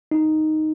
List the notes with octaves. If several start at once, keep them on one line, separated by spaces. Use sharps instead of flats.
D#4